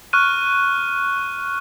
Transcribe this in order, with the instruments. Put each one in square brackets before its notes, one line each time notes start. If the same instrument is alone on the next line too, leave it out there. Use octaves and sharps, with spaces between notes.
[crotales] C#6 F6 F#6 D#7